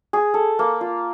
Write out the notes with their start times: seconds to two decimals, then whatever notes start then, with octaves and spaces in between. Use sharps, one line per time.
0.13 G#4
0.34 A4
0.59 A#3
0.81 F4